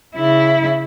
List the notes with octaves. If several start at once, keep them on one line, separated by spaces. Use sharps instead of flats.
C#3 E4